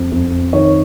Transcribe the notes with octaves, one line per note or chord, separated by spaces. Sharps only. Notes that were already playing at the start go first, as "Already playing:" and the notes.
Already playing: F2
F2
D#3 C#5